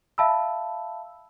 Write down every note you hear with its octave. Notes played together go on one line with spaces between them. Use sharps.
E5 F5 A5 B5 E6